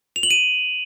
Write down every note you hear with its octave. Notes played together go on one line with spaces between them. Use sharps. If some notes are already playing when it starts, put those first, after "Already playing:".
F7
F#7
D#7